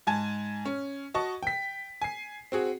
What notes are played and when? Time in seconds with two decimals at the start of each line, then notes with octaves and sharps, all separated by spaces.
0.07 G#2 G#5 A5 G#6
0.65 C#4
1.14 F#4 D#5 A5 C#6
1.43 G5 B6
2.02 G#5 C7
2.52 C4 F#4 G#4